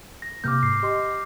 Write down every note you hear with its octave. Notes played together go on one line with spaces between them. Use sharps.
A#6
C3 A#3 D6 F6 G6
G#2 C7
G4 D#5 C6